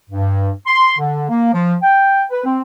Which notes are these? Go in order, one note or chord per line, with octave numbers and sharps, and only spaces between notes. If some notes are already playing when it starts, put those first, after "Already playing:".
G2
C6
D3
A#3
F3
G5
B4
C4